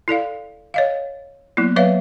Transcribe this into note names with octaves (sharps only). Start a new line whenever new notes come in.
E4 A4 D5 F5
C#5 D#5 F5
F#3 A#3 B3 E4
F#3 B4 C#5 E5 F5